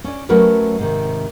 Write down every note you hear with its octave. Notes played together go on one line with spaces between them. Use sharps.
C#4 D5
F#3 A3 C#4 F#4 A#4 B4
G#2 C3 D#3